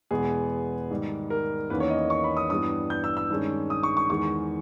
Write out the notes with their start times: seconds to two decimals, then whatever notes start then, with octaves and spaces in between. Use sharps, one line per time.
0.11 E2 B2 G#3 B3 G#4
0.90 G#2 D#3 G3
1.30 A#4
1.70 E2 D#3 A#3 C#4 B4
1.80 C#5
1.90 D#5
2.10 C#6
2.24 B5
2.37 D#6
2.50 G2 E3 G3 B3 D#6
2.90 G6
3.04 E6
3.17 E6
3.30 G2 D#3 G#3 C#4
3.70 D#6
3.83 C#6
3.97 C#6
4.10 E2 D#3 G#3 C#6